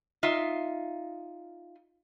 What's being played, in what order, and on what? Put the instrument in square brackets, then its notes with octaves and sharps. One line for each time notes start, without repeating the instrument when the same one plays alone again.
[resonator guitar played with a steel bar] D#4 F4 E5